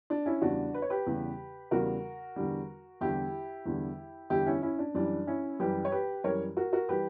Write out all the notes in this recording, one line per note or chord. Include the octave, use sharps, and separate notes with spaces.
D4
C#4 E4
E2 C#3 G3 D4 F#4
B4
C#5
G4 B4
E2 C#3 G3
E2 C#3 G3 F#4 A#4
E2 D3 G3
E2 D3 G3 E4 G4
E2 D3 G3
E2 D3 G3 E4 G4
C#4 E4
C#4 E4
D4
F#2 E3 G3 D4
C#4 E4
F#2 E3 G3 G4 B4
C#5
G4 B4
F#2 E3 G3 A#4 C#5
F#4 A#4
F#4 A#4
E3 G3 G4 B4